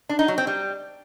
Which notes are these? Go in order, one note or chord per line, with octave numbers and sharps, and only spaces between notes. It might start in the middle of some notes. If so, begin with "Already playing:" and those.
D4
D#4
F#3
C4
G3